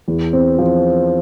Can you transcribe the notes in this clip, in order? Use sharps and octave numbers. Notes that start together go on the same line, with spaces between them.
E2
C4
F3